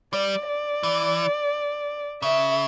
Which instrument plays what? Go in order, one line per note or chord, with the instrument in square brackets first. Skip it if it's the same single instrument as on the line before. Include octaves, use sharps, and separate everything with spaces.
[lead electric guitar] G3 [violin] D5
[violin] D5
[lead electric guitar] E3
[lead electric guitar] C#3 [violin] E5